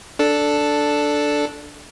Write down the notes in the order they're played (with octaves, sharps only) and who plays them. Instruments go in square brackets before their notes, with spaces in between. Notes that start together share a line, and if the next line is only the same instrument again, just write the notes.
[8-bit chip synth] D4 A4